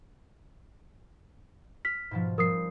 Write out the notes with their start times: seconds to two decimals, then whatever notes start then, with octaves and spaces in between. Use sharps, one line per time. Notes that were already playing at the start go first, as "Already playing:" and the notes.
1.85 F6 B6
2.11 G#2 B2 F3
2.38 F3 G3 C4 A#4 D#6 C7